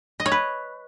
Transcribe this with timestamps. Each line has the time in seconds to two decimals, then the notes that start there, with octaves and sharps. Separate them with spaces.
0.20 D#5
0.26 C#5
0.32 B4